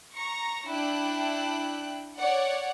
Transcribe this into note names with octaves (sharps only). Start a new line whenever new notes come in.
A#5 C#6 A#6
D4 E4 G5 F#6
C#5 D5 F#5